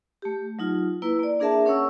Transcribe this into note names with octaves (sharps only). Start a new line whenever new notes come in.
A3 G4
F#3 D#4 F4
A#3 E4 B4
A#3 D5
A#3 D4 G#4 A#4 E5 A5
C#4 A#4 C#5 F#5 C#6 E6